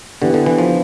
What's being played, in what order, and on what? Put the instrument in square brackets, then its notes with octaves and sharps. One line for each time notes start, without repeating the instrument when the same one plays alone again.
[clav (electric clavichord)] D3 [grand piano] E3 B3 D4 G4
[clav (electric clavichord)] D3
E3
F3